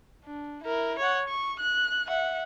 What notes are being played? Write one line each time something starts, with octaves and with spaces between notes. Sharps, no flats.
D4
E4 A#4
C#5 F#5
C#6
F#6
E5 F#5